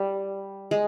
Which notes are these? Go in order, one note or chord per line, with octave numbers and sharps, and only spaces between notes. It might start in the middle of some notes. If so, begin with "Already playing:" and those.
Already playing: G3
G#3